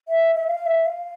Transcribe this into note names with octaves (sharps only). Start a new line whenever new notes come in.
E5
E5
F5
E5
F5